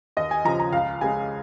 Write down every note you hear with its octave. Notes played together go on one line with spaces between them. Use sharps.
D#2 D#5
G#5
C#3 F3 A#5
A#5
C#2 F5
C#3 G#3 G#5